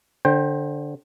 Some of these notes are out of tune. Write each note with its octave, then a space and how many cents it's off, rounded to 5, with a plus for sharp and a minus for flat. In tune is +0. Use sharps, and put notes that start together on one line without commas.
D3 +0 C5 +25 G5 +0